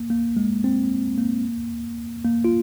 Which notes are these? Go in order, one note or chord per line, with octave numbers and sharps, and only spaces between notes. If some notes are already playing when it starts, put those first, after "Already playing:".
Already playing: A#3
A#3
G#3
C4
A#3
A#3
F4